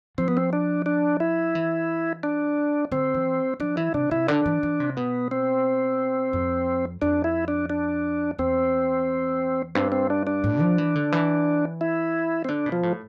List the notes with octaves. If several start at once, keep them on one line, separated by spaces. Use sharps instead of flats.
F3 C4
B3
C4
D4
D4
E4
E3
D4
D3 C4
E3
F3 D4
E3 E4
C3 D4
C3 E4
D3 D4
E3
E3
C3
B2 B3
C4
F2
F2 D4
E4
D4
D4
E2 C4
G2 C4
C4
D4
D4
A2
F3
E3
D3
E3
E4
C4
D3 D4
B2
F3
A2